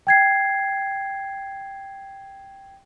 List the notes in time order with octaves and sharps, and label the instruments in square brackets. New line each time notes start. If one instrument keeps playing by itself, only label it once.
[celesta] G5 G#6 C7